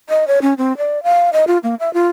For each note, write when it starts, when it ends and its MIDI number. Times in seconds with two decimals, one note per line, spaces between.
0.09 0.27 75
0.27 0.39 73
0.42 0.54 61
0.58 0.76 60
0.78 1.02 74
1.03 1.30 77
1.33 1.45 75
1.47 1.58 65
1.63 1.75 58
1.80 1.92 76
1.94 2.09 65